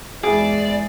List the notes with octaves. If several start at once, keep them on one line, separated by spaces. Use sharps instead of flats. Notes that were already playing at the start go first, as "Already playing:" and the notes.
E2 G#2 E4 G#4 D5